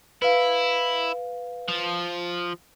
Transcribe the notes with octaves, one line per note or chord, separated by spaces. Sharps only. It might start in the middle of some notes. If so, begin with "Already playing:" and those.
E4 B4 F5
F3